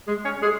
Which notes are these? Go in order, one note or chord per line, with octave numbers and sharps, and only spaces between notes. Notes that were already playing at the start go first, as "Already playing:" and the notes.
G#3 G#4
C#4 C#5
G#3 G#4